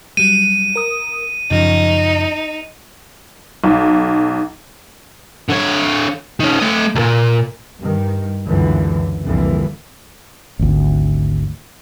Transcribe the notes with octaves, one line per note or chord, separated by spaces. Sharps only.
F#3 G3 D#7
A#4 D#6
F#2 C#3 F3 D#4
B1
D3 C#5
D#3 C#4
A3 D#5
D2 A#2
G2 D#3
C#2 F#2 D3 E3 F#3
C2 F2 A#2 D3 E3
G#1 D2